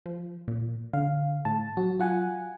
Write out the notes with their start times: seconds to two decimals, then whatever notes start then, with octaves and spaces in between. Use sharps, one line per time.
0.06 F3
0.48 A#2
0.93 D3 F5
1.45 A2 A5
1.77 F#3 F#4
2.00 F4 F#5 G#5